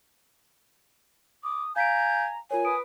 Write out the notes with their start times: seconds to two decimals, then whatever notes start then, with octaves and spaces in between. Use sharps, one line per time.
1.43 D6 D#6
1.76 F5 G#5 A#5 G6 B6 D7
2.51 F4 A#4 C#5 G#5
2.65 B4 D#6 D7